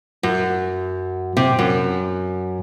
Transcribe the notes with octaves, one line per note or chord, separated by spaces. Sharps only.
F#2
C3
F#2